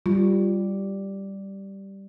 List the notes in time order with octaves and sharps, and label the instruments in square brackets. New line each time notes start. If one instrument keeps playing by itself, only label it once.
[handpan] G3 [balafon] F4